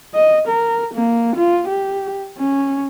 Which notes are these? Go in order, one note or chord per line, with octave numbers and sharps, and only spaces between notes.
D#5
A#4
A#3
F4
G4
C#4